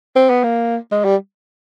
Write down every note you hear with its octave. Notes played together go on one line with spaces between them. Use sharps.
C4
B3
A#3
G#3
G3